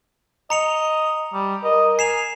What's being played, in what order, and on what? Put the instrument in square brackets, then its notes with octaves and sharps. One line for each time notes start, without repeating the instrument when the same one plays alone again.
[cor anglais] D#5 [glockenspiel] A#5 C#7 F7
[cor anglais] G3
[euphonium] A#4 [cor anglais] D#5
[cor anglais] G#5 [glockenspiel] C7 E7 F7